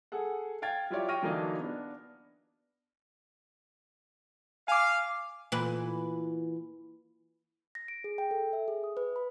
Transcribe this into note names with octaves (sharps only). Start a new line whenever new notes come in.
G#4 A4 F#5
F5 G5 G#6 A6
F#3 E4 F4 G4 C#5 D5
G5 C#6 F6 A#6 D#7
D3 E3 F#3 A#3 D4 D#4
B3 D4
F5 G#5 D6
A#2 E3 B4
A#6
D7
G#4
G5
A4
E5
G#4
D#6
B4
B5